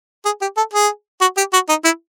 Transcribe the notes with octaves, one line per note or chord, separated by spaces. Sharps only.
G#4
G4
A4
G#4
F#4
G4
F#4
D#4
E4